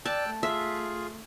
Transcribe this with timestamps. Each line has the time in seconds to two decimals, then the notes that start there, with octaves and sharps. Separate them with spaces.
0.05 D5 G5 A5 E6 F#6
0.28 A3
0.43 F4 G#4 E5